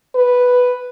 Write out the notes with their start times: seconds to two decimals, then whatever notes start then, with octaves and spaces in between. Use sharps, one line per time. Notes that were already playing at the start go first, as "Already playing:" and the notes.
0.15 B4